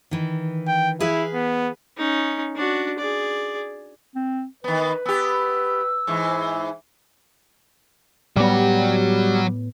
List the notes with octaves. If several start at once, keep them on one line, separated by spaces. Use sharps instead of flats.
D#3 E3
G5
E4 G#4 B4 F5
B3
C#4 D#4
D4 F#4
G#4 D5
C4
D#3 B3 B4
B3 G4 E6
G#2 E3
A2 F#3 G3 B3 F#4